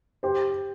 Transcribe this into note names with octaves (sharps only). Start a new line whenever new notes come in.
G4 C5